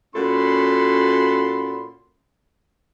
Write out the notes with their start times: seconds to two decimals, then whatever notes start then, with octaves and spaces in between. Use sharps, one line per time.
0.15 A#2 C#4 F#4 A4 B5 C6